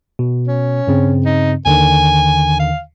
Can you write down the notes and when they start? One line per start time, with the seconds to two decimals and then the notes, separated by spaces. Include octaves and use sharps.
0.19 B2
0.48 C#4
0.87 G2 C#3 C4
1.25 D#4
1.66 D#2 D3 D#3 G#5
2.59 F5